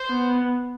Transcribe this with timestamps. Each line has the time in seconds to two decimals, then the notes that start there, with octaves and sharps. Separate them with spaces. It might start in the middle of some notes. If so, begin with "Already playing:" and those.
Already playing: C5
0.10 B3